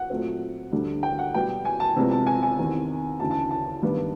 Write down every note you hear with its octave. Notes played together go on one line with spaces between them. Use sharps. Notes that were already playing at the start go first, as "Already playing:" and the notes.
Already playing: F#5
A#2 F#3 A3 C4
D2 D3 G3
G5
F#5
B2 G3 B3 G5
G#5
A5
C2 C3 F3 G#3 B3
A5
G#5
G#5
E2 C3 D#3
D2 C#3 E3 A5
A5
A5
G2 D#3 G3 B3